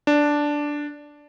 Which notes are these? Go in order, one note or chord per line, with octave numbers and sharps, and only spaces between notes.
D4